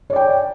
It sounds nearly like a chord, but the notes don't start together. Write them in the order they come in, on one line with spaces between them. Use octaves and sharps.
C#5 D5 G5